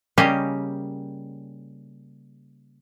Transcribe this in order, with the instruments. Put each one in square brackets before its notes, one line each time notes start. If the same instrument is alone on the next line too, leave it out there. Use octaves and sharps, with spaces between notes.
[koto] C#3 G3 A#3 C#4 G4 D#5